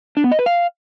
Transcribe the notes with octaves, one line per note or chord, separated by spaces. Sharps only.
D4
B3
D#5
B4
F5